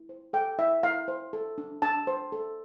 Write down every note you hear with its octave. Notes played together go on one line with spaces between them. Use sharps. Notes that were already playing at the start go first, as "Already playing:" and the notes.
Already playing: E4
C5
A4 G5
E4 E5
E4 F5
C5
A4
D4
D4 A5
C5
A4